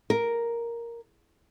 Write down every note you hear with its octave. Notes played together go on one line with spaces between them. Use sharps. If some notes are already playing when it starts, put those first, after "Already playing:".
A#4